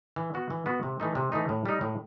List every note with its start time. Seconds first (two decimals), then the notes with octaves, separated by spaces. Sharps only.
0.16 E3
0.34 B3 F#4
0.50 E3
0.66 B3 F#4
0.83 C3
1.00 E3 A3 D#4
1.15 C3
1.32 E3 A3 D#4
1.49 A2
1.66 G3 D#4
1.81 A2